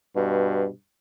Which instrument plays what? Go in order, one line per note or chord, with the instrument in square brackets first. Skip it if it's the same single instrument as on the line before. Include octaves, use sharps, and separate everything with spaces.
[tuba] G2 [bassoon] B2